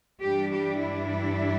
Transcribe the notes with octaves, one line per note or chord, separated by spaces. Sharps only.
G2 E3 G3 D4 G4
G4
E4